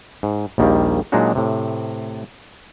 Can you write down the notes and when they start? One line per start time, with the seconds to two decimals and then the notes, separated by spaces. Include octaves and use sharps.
0.23 G#2
0.58 A#1 D#2 D#3 G3 A#3
1.12 A#2 F#3 G#3 D4 D#4 F#4
1.35 A2 C3